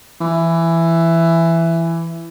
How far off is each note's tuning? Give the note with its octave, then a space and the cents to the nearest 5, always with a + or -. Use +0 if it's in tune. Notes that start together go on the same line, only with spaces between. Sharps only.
E3 +10